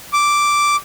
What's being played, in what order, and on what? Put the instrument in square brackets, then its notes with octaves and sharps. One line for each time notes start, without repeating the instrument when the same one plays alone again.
[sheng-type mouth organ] D6